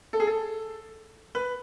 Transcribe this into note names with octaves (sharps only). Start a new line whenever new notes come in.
A4
G#4
A4
B4